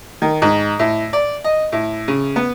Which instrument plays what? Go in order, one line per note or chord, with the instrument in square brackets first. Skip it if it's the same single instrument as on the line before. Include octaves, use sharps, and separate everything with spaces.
[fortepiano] D#3
G#2
A2
D5
D#5
A2
C#3
B3